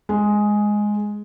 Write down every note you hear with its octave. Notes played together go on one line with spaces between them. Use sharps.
G#3